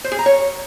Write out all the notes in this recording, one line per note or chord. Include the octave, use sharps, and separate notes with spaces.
C5
G#4
A#5
C#5